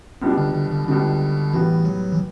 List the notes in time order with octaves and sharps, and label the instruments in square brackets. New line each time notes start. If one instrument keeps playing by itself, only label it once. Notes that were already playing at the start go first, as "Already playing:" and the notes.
[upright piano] C#2 B2 G3 D4 [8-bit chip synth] B3
[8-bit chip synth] D3
D3
D3
[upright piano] C#2 B2 G3 D4 [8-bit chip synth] D3
[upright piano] A2 G3 B3 F#4 [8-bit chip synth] E3
[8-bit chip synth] F#3
E3